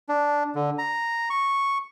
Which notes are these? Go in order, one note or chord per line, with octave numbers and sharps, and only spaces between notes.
D4
D3
A#5
C#6